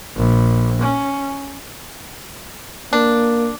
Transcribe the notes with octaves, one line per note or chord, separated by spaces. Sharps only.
A#1
C#4
A#3 D4